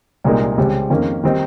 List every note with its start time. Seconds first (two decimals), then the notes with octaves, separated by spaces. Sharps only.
0.24 C2 A#2 G#3 D#4 A#4
0.58 C#2 C3 G3 C4
0.90 F2 D#3 A#3 C#4
1.24 D#3 G3 C4 D#4